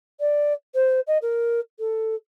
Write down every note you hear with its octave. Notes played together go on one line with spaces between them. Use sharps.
D5
C5
D#5
A#4
A4